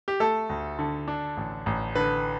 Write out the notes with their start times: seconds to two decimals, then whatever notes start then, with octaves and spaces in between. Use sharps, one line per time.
0.08 G4
0.20 A3 A4
0.49 D2
0.79 D3
1.08 D4
1.37 A1
1.66 A1
1.95 D3 B4